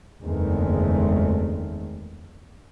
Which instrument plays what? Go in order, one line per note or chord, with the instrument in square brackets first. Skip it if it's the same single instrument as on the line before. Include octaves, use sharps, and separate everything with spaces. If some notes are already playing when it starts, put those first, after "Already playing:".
[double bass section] F#1 E2 D#3 G#3 A3 C4